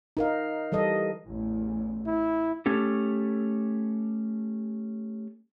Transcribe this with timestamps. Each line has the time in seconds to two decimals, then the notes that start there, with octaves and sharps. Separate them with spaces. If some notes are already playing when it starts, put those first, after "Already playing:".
0.17 D#4 A#4 F5
0.72 E3 G3 A4 D#5
1.28 A1 E2
2.07 E4
2.66 A3 C#4 G4 A4